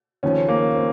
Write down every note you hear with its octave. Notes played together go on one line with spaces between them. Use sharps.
D#2 C#3 F3 C#4
A#3
C4